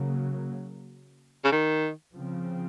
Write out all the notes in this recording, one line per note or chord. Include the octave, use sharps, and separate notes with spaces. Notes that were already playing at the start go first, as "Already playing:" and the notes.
Already playing: C#3 F#3 A#3
C#3
D#3
C#3 F3 C4